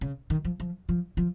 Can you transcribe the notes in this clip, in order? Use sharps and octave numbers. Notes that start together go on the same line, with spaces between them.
C#3
D#3
F3
F3
F3
F3